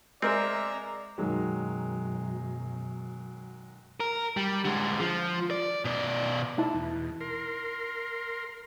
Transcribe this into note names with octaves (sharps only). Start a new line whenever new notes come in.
G#3 C4 A#4 D5 E5 A#5
F#2 B2 D#3 F#3 G#3
A#4
G3
D3 G#3
F3
D5
B2 D5
D#4 E4 A5
E2 B2
A#4 C6